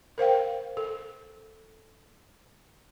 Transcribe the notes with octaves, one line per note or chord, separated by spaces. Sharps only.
A#4 C5 F5 G5
A4